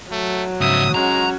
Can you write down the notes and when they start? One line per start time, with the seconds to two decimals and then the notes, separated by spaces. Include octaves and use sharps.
0.12 F#3 A3
0.61 G#2 C#3 E5 D#6
0.95 G#3 C#4 F#4 A#5